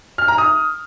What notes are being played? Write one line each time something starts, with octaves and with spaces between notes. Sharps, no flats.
F6
A#5
D#6